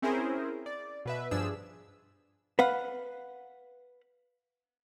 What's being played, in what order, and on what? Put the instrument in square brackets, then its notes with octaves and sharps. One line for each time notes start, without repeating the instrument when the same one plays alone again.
[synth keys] C4 C#4 E4 G#4 A#4 C5
D5
B2 B4 E5
G2 F3 D4 G#4 E6
[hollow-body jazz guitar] B4 F5 F#5